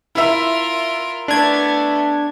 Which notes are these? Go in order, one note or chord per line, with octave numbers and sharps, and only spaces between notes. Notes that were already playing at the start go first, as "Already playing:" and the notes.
E4 F4 A#4 E5
A3 B3 D4 G#6